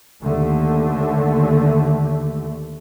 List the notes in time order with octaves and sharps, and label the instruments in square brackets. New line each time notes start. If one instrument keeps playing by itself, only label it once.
[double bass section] D#2 D3 A3